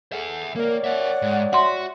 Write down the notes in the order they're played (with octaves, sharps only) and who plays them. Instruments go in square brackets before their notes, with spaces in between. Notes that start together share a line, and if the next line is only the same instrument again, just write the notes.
[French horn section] G#4 A4 [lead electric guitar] E5 F#5
[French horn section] A2 C#5 D5 [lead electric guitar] A#3 [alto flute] A#4
[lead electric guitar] A#4 E5 [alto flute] F#5
[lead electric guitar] G#2
[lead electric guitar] F#4 [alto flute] E5 [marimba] F#5 C6